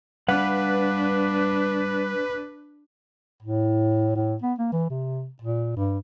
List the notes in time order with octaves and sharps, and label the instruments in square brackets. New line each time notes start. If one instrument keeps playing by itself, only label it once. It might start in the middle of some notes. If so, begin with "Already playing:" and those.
[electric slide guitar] G3 F5 F#5 [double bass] D4 [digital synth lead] B4
[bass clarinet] A2
A2
B3
A#3
E3
C3
A#2
G2